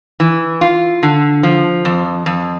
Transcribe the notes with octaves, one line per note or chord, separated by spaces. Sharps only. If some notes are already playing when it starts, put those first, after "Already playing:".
E3
F4
D3
F3
F2
F2